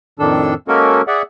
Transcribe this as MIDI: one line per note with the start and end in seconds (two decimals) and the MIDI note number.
0.19 0.54 41
0.19 0.54 45
0.19 0.54 51
0.19 0.54 62
0.19 0.54 69
0.19 0.54 88
0.68 1.02 56
0.68 1.02 58
0.68 1.02 61
0.68 1.02 66
0.68 1.02 69
0.68 1.02 70
1.07 1.22 68
1.07 1.22 74
1.07 1.22 76
1.07 1.22 78